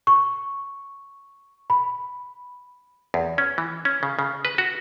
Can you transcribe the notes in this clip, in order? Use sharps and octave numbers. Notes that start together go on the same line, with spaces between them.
C#6
B5
E2
C#4
E3
C#4
C#3
C#3
B4
F#4